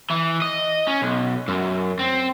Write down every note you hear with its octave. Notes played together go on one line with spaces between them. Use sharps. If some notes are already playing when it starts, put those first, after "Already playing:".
E3
D#5
C#4
B1
F#2
C4